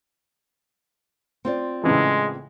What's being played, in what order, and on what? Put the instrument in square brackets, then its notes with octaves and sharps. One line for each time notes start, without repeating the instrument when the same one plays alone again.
[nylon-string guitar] C4 F4 D5
[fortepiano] A2 C#3 E3 [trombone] G#3